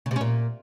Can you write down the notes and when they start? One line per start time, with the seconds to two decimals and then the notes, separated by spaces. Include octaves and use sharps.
0.06 C#3
0.11 C3
0.16 C#4
0.21 A#2